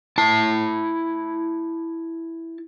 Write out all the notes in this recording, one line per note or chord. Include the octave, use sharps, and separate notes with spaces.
E4 A5